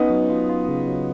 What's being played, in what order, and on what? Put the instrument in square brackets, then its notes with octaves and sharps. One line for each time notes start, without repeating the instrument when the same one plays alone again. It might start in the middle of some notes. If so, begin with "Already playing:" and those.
Already playing: [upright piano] B3 D#4 [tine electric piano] C#4
[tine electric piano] F#3
F4
F4
C#3
F#3